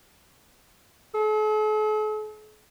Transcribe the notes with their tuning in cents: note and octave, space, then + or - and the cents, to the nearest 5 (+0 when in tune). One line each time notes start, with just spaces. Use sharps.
A4 -45